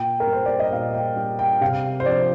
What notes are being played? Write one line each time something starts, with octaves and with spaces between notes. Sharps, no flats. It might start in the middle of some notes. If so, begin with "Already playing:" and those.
Already playing: A#2 G5
A#4
G3
C5
D5
D#5
A#2 F5
G5
G3
G5
C3 F5
C5
F3 D5